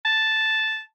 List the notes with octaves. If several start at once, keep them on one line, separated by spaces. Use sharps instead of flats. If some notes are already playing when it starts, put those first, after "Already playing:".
A5